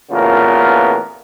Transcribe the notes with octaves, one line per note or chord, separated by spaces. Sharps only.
A1 A#2 C#3 B3 F4 A#4